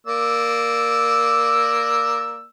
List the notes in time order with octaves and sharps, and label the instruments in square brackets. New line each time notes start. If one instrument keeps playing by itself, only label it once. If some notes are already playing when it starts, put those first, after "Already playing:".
[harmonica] A#3 D5 E6